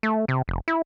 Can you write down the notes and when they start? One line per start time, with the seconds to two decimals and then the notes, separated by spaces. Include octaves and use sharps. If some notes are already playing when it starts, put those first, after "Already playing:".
0.03 A3
0.28 C3
0.48 F1
0.68 E4